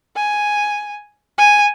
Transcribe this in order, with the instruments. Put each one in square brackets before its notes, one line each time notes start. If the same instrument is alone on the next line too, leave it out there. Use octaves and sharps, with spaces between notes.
[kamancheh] G#5
G#5